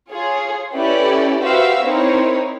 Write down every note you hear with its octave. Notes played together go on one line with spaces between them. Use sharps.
F4 G#4 C#5
C#4 E4 G4 A4 B4 D5
F#4 G4 B4 C5 E5 F5
C4 D#4 E4 A#4 C5 C#5